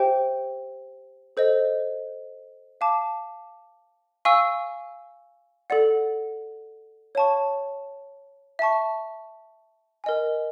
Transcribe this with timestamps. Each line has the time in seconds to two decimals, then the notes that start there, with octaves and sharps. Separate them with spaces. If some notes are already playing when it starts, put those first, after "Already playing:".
Already playing: G4 C5 E5 G5
1.37 A4 C5 D#5
2.81 F5 A5 D6
4.25 F5 G#5 C#6 E6
5.70 A4 D5 F#5
7.15 C#5 F5 A5 C#6
8.59 E5 A5 C#6
10.04 A#4 D#5 G#5